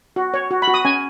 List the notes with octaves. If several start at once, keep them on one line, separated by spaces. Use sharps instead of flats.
F#4
C#5
F#4
B5
F#4
D#6
C#4 G#5